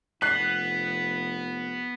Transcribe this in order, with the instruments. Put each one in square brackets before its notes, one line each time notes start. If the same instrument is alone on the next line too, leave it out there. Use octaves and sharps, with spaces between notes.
[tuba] F1 [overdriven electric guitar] B3 [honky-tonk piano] F#6 C7